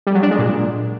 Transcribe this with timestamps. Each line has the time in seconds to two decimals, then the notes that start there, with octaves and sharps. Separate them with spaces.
0.07 G3
0.15 F#3
0.23 D4
0.31 G#3
0.39 A#2